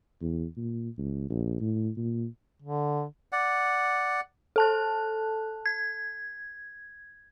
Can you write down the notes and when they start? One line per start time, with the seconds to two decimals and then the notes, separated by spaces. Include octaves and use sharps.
0.21 E2
0.57 A#2
0.98 C#2
1.30 A#1
1.61 A2
1.97 A#2
2.62 D3
3.32 D5 F#5
4.56 A4 A5 F#6
5.66 G#6